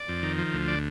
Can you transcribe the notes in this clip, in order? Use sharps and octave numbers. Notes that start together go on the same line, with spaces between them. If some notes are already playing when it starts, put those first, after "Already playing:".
Already playing: D5
F2
D#3
F3
D2
D5